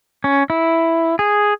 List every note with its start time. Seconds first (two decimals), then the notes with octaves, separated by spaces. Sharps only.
0.24 C#4
0.50 E4
1.19 G#4